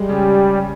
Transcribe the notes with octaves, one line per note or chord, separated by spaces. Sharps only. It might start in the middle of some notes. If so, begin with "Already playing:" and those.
Already playing: G3 G#3
C#3